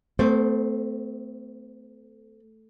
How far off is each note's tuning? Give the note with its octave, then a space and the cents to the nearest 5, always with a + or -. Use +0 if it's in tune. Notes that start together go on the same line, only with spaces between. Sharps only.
A3 +0 C4 -40 C5 +10